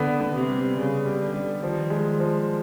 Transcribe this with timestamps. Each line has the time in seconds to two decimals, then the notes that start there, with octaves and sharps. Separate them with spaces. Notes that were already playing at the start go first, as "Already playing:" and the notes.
Already playing: D3 B3
0.21 B3
0.34 C3
0.48 G3
0.77 C#3 G3
1.05 G3
1.20 D3
1.34 G3
1.62 D#3 F3
1.90 G#3
2.20 F3